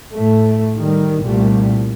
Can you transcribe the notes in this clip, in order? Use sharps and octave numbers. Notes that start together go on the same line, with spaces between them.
A2 A3
D#3 G3
C2 A#2 G3 A3